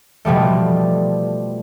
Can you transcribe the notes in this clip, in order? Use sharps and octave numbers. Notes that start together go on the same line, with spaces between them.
B2 F3 G3 A3